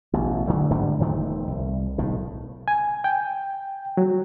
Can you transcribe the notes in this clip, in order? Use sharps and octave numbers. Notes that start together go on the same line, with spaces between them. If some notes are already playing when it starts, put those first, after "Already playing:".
A1 B2
D3 F#3 A3
G#2 D3 F#3 G3
E1 D#3 F3 A3
C2
B1 A2 D#3
G#5
G5
F#3